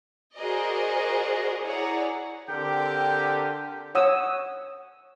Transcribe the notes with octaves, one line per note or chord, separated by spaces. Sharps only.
F#4 G#4 A#4 C5 D5 D#5
E4 G#4 C#5 D5 F#5 A#5
D3 C4 G4 A#4 G5
C#5 F#5 D#6 E6